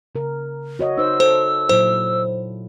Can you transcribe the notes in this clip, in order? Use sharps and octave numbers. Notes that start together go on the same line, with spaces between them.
C#3 A#4
F#4 C#5 D#5
D#4 C5 E6
A4 C5
A#2 F#3 E4 C5